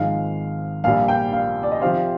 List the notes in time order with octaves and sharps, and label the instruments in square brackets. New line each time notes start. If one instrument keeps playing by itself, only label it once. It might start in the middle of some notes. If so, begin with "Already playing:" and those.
Already playing: [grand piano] G#1 G#2 F3 G#3 D#4 [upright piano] F5
[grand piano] A#1 A#2 G3 [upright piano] F5
[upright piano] G5
F5
D5
D#5
[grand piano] C3 F3 C4 G4 C5 [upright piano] F5